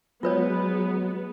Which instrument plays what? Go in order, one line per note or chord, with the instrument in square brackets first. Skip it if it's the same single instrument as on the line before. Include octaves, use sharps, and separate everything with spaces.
[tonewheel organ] F#3 [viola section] G#3 B3 [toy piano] F4 B4 C#5